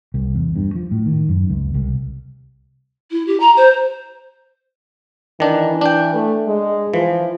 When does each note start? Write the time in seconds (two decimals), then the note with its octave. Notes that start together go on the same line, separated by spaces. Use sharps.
0.14 C2
0.35 E2
0.56 G2
0.75 F3
0.91 A2
1.06 D#3
1.29 F#2
1.50 C#2
1.74 C2
3.11 E4
3.27 G4
3.40 A#5
3.57 C5
5.40 D#3 E3 D4
5.81 D4 G5
6.14 A3
6.47 G#3
6.94 E3 F3